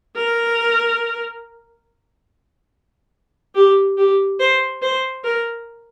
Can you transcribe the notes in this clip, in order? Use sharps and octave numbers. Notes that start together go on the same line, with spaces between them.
A#4
G4
G4
C5
C5
A#4